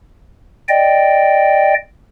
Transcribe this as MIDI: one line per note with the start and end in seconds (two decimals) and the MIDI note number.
0.69 1.74 74
0.69 1.74 75
0.69 1.74 79